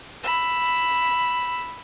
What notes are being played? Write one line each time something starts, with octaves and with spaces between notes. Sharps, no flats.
B5 E6